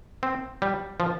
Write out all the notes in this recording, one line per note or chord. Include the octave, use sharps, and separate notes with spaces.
C4
G3
F3